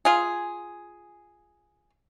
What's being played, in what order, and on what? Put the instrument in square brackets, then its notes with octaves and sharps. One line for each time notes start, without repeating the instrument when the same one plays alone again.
[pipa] F4 G#4